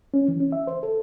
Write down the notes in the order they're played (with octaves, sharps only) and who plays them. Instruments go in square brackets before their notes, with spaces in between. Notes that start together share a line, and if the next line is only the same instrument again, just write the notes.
[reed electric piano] C#4
E3
C#4
E5
C5
A4